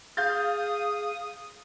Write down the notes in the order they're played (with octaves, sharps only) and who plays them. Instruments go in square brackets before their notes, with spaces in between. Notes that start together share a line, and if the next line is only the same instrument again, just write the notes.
[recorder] G#4 [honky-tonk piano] F5 G6 A6 [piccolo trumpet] D#6